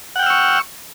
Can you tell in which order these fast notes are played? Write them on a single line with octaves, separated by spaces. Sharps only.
F#5 G5 F6 E6 C#6